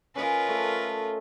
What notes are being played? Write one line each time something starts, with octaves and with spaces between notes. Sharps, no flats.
C#4 F4 A#4 B4 D#5
A3 A4